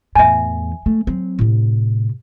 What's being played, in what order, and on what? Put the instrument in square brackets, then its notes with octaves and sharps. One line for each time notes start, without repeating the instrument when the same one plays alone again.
[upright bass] E2 A2 [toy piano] E5 G#5
[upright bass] A3
F#3 C4
A2 C3